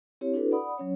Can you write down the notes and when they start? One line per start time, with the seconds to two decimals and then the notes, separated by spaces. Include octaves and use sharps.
0.21 C4 E4 G4 C#5
0.34 D4 E4 F#4 A4 B4
0.51 D5 F#5 B5 D#6
0.78 F#3 C#4 C#5